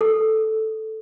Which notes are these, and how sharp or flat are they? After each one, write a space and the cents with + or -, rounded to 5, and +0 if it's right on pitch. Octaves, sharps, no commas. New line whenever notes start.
A4 -5